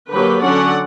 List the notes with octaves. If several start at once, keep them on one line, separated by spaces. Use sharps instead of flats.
D3 F#3 A#3 G4 B4
D3 F#3 C#4 D5 F#5